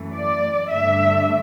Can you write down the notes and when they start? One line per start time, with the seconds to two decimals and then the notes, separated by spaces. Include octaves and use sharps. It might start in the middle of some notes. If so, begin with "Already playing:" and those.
Already playing: F#2 E3 A3
0.15 D5
0.69 G2 D3 A3 D4 E5